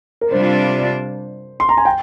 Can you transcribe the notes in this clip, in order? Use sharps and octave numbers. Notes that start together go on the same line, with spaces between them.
A#4
C3 G3 D4 F4 C5
C6
A#5
G#5
G5